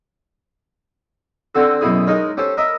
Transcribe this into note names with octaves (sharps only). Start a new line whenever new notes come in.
D3 C4 F#4 A4
F#2 B2 E4 G#4
G#3 D#4 A#4 C#5
C#4 G4 A4 C5
A#4 D#5 E5 B5